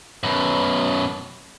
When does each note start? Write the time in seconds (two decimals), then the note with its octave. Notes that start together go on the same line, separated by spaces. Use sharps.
0.23 F#2 B2